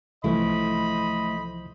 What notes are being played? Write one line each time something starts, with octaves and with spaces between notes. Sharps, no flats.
C2 E3 F3 A3 E4 C5 D#5 B5